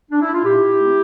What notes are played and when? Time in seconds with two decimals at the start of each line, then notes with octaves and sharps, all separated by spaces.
0.11 D4
0.21 E4
0.33 F4
0.44 A#2 E4 G4
0.79 A3 C4